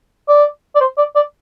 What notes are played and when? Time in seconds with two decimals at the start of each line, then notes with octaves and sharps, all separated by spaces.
0.29 D5
0.76 D5
0.81 C5
0.98 D5
1.16 D5